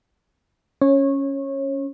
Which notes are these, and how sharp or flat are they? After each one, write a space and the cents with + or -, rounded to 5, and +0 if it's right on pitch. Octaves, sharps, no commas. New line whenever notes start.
C#4 +0 C#5 -25